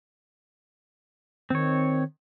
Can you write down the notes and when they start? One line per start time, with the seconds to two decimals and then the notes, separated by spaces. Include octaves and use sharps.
1.50 D#3 C4 C#5